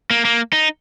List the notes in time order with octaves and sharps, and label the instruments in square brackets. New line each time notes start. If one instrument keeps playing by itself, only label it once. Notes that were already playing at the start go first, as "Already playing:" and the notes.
[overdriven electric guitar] A#3
A#3
D#4